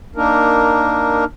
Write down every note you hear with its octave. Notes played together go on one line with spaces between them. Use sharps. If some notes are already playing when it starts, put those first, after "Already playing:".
A#3 D4 D#4 A#4